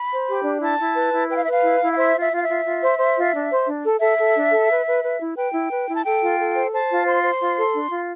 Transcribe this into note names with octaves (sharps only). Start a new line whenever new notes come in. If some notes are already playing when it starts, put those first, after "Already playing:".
Already playing: B5
C5
G4
D4
E4 A5
E4
B4
E4
B4 G5
F5
B4 E5
F5
E4
E4
F5
C5 E5
F4
E5
F4 F5
F4 E5
F4
C5
C5
F4
D4
C5
D4
A4
A4 E5
A4
D4
A4
B4
B4
B4
E4
B4 G5
E4
B4
E4
A5
A4 G5
F4
A4
C5
C5 A5
F4
C5 C6
C5
F4
A4
D4
F4